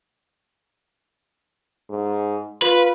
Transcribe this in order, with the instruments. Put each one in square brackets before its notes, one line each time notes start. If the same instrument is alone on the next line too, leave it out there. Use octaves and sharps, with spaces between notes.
[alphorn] G#2
[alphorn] F4 [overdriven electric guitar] B4